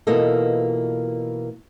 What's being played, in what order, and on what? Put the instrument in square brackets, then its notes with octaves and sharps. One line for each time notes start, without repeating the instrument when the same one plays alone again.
[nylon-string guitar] B2 E3 A#3 F4 A4 D#5